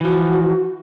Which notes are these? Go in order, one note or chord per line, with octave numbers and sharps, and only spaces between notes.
E3 F3 F#4